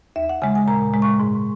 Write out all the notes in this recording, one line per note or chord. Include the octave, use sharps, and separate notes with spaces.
D#2 E5
F#5
C#3 G#3 G#5
G#5
A#2 A#5
G#3
C#6
G#2